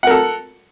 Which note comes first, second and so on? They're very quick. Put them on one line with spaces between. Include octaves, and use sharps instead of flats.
F#5 A#4 A4